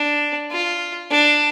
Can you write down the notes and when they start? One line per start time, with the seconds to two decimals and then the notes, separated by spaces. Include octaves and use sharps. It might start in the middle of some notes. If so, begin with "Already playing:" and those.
Already playing: D4
0.52 F4
1.11 D4